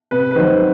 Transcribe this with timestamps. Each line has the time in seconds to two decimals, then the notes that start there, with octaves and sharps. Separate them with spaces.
0.11 C3 B4
0.31 B4
0.35 D#3 F#3 C5